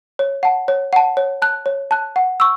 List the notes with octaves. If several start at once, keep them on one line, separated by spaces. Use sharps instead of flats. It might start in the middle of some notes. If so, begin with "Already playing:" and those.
C#5
F#5 A5
C#5
F#5 A5
C#5
A5 F#6
C#5
A5 F#6
F#5
C#6 E6